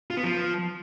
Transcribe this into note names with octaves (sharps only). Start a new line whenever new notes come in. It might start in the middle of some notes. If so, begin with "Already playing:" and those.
F4
B3
F3